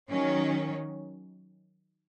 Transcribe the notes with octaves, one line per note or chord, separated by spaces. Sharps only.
D#3 F#3 C#4